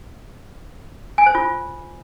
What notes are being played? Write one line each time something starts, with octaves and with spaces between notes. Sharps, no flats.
G#5
C5
F4